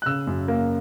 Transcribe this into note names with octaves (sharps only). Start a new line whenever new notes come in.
F#6
C#3 E6
F#2
A#3